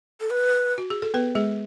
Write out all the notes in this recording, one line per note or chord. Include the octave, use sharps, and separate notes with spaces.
A4
B4
F#4
G#4
A4
B3 B4
G#3 G#4